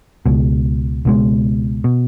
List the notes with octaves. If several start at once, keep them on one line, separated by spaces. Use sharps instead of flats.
C#2 B2 G#3
C#2 B2 G#3
B2